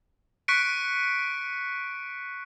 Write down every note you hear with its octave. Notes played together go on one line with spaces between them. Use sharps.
C#6 F#6 B6 C#7 D7